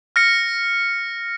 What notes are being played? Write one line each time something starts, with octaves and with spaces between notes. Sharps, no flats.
F6 A#6 C#7